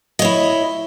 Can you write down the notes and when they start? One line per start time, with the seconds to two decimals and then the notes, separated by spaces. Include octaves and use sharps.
0.19 D#5
0.22 C#5
0.25 E4